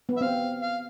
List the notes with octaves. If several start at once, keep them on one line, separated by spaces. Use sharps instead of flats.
B3
E5
C4 F5
F5